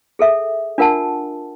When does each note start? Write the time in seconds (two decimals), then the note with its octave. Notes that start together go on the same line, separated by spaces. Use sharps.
0.19 G#4 A4 E5
0.78 D4 F4 A#4 F#5 A5